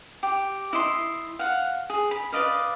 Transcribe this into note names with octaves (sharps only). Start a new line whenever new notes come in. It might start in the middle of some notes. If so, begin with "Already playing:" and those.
G4
E4 D#5 C6
F5 F#5
G#4
B5
B4 D5 D#5 F5